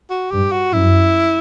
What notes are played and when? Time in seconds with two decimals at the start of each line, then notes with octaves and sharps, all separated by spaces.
0.10 F#4
0.31 G2 G4
0.52 F#4
0.73 F#2 E4